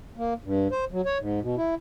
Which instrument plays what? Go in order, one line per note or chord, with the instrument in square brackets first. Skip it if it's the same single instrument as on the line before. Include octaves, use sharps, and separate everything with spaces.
[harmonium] A#3
G2
C5
F#3
C#5
G#2
B2
E4